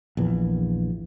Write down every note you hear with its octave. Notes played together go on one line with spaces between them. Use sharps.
A#1 E2 E3